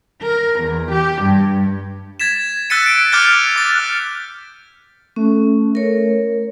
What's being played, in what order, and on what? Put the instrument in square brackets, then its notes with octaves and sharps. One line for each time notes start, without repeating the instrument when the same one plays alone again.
[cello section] A#4
E2
G4
G2
[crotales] G#6 A6 B6 E7
E6 F#6 A6 B6 C#7 D#7
B6 D7
D6 F6 G6 A6 G7
D6 A6
F6 F#6
[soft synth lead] A3 [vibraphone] C#4
[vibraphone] A#4 C#5